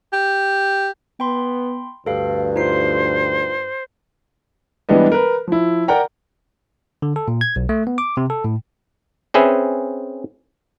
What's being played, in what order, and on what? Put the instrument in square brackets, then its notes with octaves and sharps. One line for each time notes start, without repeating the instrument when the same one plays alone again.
[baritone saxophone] G4
[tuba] B3 [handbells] G5 B5 C6
[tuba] D2 [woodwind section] G2 [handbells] A4 F5
[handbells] D#4 F4 C7 [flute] C5
[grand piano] E3 G3 G#3 B3 D4 D#5
A#4 B4
F3 E4
A#4 D5 F#5 G5 A#5
[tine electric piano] D3
A4
A#2
G#6
B1
A3
B3
D6
C3
A4
A2
[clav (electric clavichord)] C4 C#4 G#4 B4 E5